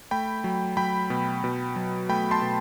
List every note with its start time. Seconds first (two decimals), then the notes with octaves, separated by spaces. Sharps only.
0.11 A3 G5 B5
0.44 F#3
0.77 F#3 G5 B5
1.10 B2
1.44 B2
1.76 F#3
2.09 A3 G5 B5
2.31 A5 C6
2.42 B2